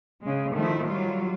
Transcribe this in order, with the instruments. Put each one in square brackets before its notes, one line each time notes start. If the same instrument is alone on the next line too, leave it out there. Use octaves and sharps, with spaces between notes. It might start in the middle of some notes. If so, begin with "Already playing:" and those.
[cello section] C#3 G#3
D#3 F3 A3 E4
F#3 G3 F4